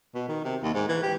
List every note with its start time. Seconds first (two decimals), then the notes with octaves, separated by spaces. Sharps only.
0.15 B2
0.29 D#3
0.44 C3
0.63 D#2
0.74 G#2
0.89 E3
1.03 G4